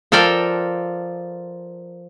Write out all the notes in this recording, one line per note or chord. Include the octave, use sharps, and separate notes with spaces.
F3 A4 A#4 D5 G5